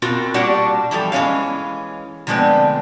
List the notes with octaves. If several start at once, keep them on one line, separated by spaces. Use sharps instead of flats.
B2 C4 F4 F#4 A#4
A#2 G3 D4 F#4 G4 F#5
E3 F3 G3 A4
E3 G#3 C#4 C#5 F5
D3 F3 G#3 A3 B3 C4